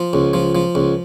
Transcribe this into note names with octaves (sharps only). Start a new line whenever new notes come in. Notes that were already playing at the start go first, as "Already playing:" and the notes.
Already playing: F3
C#2
F3
F3
C#2